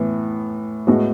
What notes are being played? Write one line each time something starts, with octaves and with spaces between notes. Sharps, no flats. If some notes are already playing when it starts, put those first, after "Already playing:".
Already playing: A2 E3 B3
A2 G#3 B3 F#4